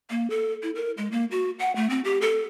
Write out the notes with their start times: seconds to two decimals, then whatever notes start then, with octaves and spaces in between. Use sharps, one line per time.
0.10 A#3
0.30 A4
0.63 E4
0.75 A#4
0.97 G#3
1.12 A#3
1.31 F#4
1.59 F#5
1.76 A3
1.90 C4
2.05 G4
2.21 A4